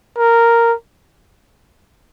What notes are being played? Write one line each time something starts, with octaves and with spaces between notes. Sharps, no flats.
A#4